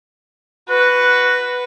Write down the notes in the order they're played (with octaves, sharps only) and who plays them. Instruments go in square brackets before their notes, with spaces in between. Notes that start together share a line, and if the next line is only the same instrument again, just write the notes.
[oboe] F#4 [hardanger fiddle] B4